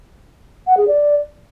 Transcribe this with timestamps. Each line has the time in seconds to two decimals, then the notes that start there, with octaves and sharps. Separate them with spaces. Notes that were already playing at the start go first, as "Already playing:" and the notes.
0.67 F#5
0.77 G#4
0.87 D5